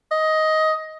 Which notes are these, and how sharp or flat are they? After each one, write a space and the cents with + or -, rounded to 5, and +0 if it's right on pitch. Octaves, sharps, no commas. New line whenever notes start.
D#5 +15